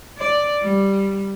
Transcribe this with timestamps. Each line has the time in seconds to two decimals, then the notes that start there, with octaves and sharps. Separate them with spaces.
0.18 D5
0.62 G3